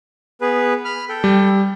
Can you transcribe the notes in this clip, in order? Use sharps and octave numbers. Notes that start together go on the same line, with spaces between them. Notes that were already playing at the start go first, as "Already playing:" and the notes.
B3 G#4 B4
B5 F6
A4 G5
G3